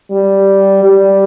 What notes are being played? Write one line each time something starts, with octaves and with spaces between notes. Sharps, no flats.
G3
G3